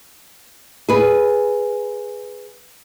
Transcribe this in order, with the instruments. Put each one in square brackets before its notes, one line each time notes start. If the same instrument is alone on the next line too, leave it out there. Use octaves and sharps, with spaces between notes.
[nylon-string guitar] G#4 B4